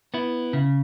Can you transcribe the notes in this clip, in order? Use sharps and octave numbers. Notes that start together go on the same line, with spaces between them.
B3 E4
C#3